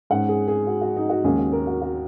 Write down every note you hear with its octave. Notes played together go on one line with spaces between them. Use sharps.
G#2 G#3 C#4 F#5
G#4
G#4
F#4
F#4
D#4
F#4
D#2 C#3 G#3 C#4 G#4
F#4
A#4
F#4
F#4